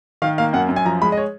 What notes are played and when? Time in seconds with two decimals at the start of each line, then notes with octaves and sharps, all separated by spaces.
0.22 D#3 F5
0.38 A#3 F5
0.53 F#2 F#5
0.69 F#2
0.76 G#5
0.85 F3 A#5
1.02 G#3 B5
1.12 D#5
1.17 C#5